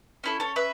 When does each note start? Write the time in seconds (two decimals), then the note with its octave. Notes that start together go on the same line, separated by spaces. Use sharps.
0.24 C#4 E4 A4
0.40 A4 C#5
0.56 B4 E5